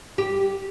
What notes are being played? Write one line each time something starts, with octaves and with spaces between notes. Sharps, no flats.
G4